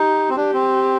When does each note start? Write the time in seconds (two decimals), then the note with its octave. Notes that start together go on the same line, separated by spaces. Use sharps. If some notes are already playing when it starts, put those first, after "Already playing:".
Already playing: D#4 G4
0.29 C4
0.36 D4 G4
0.53 C4